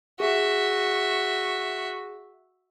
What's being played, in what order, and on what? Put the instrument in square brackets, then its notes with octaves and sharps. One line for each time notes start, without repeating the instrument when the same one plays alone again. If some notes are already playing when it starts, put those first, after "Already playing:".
[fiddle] F#4 E5 [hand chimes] G#4